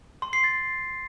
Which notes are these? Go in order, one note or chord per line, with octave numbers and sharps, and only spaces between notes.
C6
C7
A6